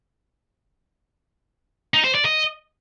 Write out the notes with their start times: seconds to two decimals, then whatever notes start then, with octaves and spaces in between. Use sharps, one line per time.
1.94 D#4
2.04 C5
2.15 D5
2.25 D#5